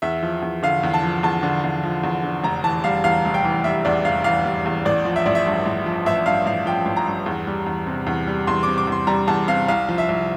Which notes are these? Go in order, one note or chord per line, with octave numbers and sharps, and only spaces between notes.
E2 E5
F3
E2
D3 F5
E2
A5
F3
E2 A5
D3
E2
F3
E2
D3
F1 A#5
E3 A5
G3 F5
E2 F5
F1
G5
E3
G3 E5
E2 D5
F1 F5
E3 F5
G3
E2
A1 D5
F3
E5
A1 D5
E5
G2
A1
F3
A1 E5
G2 F5
A1 F5
F3 G5
A1
A#5
G2
E2
G3
E2
C3
E2
G3
E2 C6
C3 D6
D6
E2
C6
G3 A#5
E2 A5
C3 F5
C2 F5
F3
E5
C2